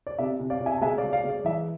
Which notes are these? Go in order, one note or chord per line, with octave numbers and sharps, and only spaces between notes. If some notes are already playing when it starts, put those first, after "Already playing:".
D5
C3 E5
C3
D5 F5
C3
E5 G#5
A5
G#3 E5 G#5
D5 F5
G#3
D5 F5
G#3
D5
E3 E5